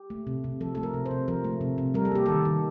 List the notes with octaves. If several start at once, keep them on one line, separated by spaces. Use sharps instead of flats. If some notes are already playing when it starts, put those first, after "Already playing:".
Already playing: G4
A3
C3
C3
F3 A4
A3 A4
A#4
C3
C5
C3
F3 A#4
A3
C3
C3
G3 A#4
A4
A#3 G4
D#3 A4
D#3